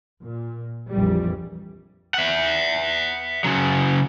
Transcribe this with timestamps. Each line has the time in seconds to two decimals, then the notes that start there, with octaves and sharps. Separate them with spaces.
0.24 A#2
0.91 A#1 F2 E3 G3
2.14 E5 F#5
3.44 C#3 F#3